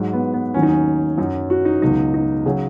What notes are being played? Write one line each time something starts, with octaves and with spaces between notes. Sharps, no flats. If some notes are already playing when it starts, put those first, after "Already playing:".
Already playing: G#2 F#3
B3
B3
D#2 D#3 F#3 C#4
D#4
C#4
F#2 F#3 D#4
F#4
D#4
C#2 B2 F#3 D#4
D#4
C#3 F#3 G#4